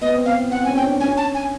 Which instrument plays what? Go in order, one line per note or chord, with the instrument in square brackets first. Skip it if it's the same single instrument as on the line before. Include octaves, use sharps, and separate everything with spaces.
[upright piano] B3 [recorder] D#5
[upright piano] C4
[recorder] F5
[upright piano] B3
[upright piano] C4 [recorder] F#5
[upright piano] C#4 [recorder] G#5
[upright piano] C#4 [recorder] G5
[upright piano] D4
[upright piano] C#4 [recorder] G#5
[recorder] A5
G#5